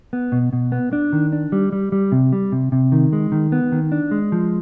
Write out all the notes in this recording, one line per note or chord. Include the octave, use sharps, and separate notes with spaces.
B3
B2
B2
B3
D4
D#3
D4
G3
G3
G3
C3
G3
C3
C3
D#3
G#3
D#3
B3
D#3
D4
G#3
F3